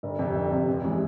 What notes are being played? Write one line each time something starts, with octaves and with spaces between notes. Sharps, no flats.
G1
F2 C3
G1
F2 C3
F1
C3 E3 G#3